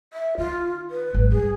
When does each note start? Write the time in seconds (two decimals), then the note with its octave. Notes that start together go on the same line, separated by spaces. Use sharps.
0.13 E5
0.38 D#3 F4
0.90 B4
1.14 G#1 F#3
1.32 G2 G#4